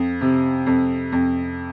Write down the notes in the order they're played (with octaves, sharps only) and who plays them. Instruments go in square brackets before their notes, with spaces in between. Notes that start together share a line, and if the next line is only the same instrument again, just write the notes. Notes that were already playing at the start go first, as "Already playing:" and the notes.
Already playing: [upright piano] F2
C3
F2
F2